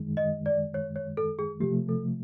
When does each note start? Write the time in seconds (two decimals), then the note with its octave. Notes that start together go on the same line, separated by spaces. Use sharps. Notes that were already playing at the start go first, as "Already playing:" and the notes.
Already playing: F#2 D#3 G#3
0.17 D#5
0.46 D5
0.74 C#5
0.96 C#5
1.17 A4
1.39 G#4
1.60 C3 F3 A3 G4
1.89 A4